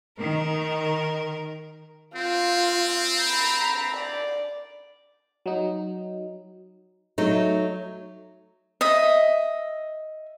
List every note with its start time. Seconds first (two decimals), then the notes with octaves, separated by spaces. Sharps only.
0.18 D#3 A#4
2.16 C4 F4
3.21 A#5 B5
3.96 D5
5.46 F#3 D#4
7.18 F#3 A3 D#4
8.81 D#5 E5